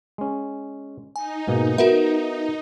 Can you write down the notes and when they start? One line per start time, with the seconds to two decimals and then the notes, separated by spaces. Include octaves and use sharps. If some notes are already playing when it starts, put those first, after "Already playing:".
0.18 G#3 C#4
1.16 D#4 G#5
1.47 G#2 B2 A#3
1.78 B3 F#4 A#4 E5